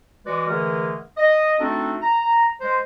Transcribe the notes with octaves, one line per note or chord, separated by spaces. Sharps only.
E3 G#3 F#4 B4 D5
D3 E3 G#3 A3 G#4 A#4
D#5
A3 C4 D4 D#4 F#4 A4
A#5
G#3 C5